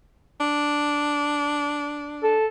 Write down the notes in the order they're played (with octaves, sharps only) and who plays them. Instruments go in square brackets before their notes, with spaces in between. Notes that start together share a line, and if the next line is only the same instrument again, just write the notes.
[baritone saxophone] D4
[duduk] A4